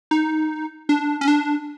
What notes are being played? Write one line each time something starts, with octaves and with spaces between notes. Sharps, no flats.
D#4
D4
C#4
D4